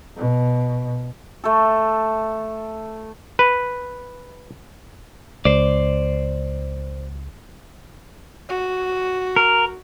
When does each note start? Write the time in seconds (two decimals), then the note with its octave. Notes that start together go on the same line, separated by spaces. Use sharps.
0.17 B2
1.44 A3 A4
3.39 B4
5.45 C#2 C5 D5
8.49 F#4
9.36 A#4